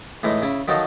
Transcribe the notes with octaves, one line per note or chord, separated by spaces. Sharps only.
A2 E3 G#3 D#4
C#3 E4
D#3 F3 F#3 D#4 A4 D#5